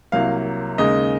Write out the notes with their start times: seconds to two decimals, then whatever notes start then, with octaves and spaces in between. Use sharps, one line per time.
0.12 C2 C3 F#3 A#3 F5
0.78 D#2 C#3 G#3 D#5